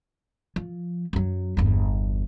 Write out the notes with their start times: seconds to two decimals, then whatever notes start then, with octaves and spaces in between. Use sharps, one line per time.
0.56 F3
1.13 F#2 F#3
1.57 G1 E2